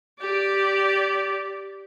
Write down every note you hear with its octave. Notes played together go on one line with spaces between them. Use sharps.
G4 D5